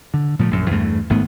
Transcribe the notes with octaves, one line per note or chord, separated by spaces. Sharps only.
D3
A#2 F3 G3 A3
A#1 F#2
E2 G2 A3
G#1 G#2 A3 B3